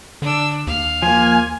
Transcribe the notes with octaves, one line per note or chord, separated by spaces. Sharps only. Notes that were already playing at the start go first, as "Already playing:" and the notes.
D3 D4 E6
D#2 F5
F3 A#3 G#5